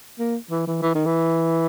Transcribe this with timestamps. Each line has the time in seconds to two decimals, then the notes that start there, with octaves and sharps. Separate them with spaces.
0.19 A#3
0.50 E3
0.67 E3
0.82 E3
0.95 D#3
1.06 E3